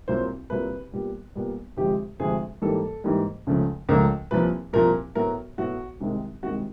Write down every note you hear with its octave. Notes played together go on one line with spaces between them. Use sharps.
C2 A#2 F#3 C5
C2 A#2 F#3 B4
A#2 G3 B3
A#2 G3 B3
D2 C3 F3 G#3 G4
D2 C3 F3 G#3 G#4
G#2 E3 G3 A#3 A4
G#2 E3 G3 A#3
C#2 C#3 F3 A3
C#2 C#3 F3 A3 A#4
C2 A#2 F3 A#3 B4
C2 A#2 F3 A#3 A#4
A2 F#3 B3 A#4
A2 F#3 B3 F#4
C2 C3 D#3 G#3
C2 C3 D#3 G#3 F#4